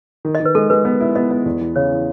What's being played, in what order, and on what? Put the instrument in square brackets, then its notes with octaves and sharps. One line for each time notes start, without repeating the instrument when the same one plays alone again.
[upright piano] D#3
[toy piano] D#5
[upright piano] D#3
[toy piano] B4
[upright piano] G#3 [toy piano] A4
[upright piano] G#3 [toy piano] B4
[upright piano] B3
E4
[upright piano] B3 [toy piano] D#5
[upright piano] B3
E2
E3
[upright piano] C#3 [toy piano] C#5
[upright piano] E3